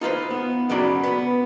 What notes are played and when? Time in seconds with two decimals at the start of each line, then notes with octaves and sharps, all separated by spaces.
0.01 D#4 F4 B4 C5
0.31 B3
0.69 F#2 C#3 F#3 D5 B5
1.03 B3 B4